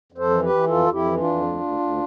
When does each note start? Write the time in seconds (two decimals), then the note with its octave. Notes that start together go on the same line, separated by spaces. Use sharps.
0.12 F2
0.18 A4 C5
0.30 E3
0.43 G4 B4
0.49 E3
0.67 F2 F4 A4
0.86 F2
0.93 E4 G4
1.05 E3
1.17 D4 F4
1.24 F2
1.42 D2
1.61 D2
1.79 D2